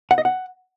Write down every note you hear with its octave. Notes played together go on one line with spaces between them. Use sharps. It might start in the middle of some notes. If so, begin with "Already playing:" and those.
F#5
D#5
F#5